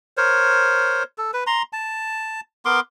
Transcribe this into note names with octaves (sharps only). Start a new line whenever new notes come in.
A#4 C5 C#5
A4
B4
A#5 C6
A5
B3 A#4 C6 D6